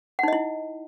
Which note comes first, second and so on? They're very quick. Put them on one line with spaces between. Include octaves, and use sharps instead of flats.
F#5 D#4 D#5 E4